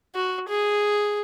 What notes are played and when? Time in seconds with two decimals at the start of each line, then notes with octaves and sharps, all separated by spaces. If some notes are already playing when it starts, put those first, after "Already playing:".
0.15 F#4
0.49 G#4